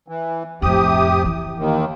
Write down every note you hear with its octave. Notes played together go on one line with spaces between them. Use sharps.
E3
F2 A2 C3 G4 D#6
E3
D#2 D#3